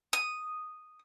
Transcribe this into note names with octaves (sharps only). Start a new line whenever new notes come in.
D#6